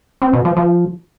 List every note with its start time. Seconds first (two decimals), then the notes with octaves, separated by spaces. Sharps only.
0.22 C4
0.33 B2
0.45 F3
0.57 F3